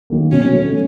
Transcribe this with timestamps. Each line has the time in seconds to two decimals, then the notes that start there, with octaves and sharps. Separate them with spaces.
0.10 D#3 F#3 A#3
0.32 B2 C#4
0.53 F#3 A3